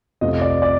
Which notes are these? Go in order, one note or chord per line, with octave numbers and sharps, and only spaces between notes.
F2 C3 F3 A3 D#5
D5
D5